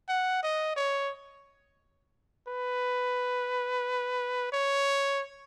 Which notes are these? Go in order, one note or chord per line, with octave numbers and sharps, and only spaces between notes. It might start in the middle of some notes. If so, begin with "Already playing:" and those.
F#5
D#5
C#5
B4
C#5